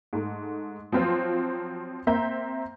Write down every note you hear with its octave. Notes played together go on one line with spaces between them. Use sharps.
G#2 A3
F3 F#3 C4 F4 C5
A#3 C4 E5 A#5 G6